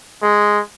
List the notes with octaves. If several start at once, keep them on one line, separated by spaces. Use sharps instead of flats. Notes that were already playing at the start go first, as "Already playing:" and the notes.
G#3